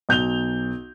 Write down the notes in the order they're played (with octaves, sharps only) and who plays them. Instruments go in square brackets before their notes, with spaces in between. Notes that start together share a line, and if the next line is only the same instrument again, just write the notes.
[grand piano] B1 G6 F7 G7